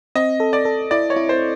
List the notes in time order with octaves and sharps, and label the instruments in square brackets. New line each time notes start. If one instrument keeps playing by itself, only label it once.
[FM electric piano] C4 [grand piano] D#5
[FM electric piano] A4
[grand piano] D5
[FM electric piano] A4
[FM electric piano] E4 [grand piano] D5
[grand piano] C#5
[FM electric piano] E4
[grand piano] C5